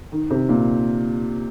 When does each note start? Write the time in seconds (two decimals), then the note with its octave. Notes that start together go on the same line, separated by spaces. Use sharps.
0.12 D#3
0.30 C3
0.49 A#2